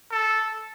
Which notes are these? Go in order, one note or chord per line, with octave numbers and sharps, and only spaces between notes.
A4